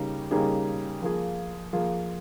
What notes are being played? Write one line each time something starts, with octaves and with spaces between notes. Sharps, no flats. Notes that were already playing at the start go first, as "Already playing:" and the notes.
Already playing: C#3 G3 A#3 D#4
C#3 G3 A#3 D#4 G#4
F3 A#3 F4 G#4
F3 A#3 F4 G#4